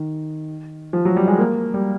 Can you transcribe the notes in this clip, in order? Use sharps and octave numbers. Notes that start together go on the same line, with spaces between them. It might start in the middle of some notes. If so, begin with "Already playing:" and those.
Already playing: D#3
F3
F#3
G3
G#3
A#3
G3